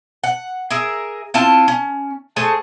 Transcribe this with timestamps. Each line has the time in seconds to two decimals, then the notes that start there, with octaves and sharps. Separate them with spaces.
0.24 F#5
0.70 G#4 A#4 E5
1.34 C4 E4 F4 A5
1.68 C#4
2.36 A3 G#4 C5 A5